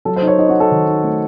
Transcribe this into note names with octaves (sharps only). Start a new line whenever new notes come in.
F#3 A4
C5
D#4
C#5
D#4 D#5
F#4
D#4
A4
D#3
D#4
A3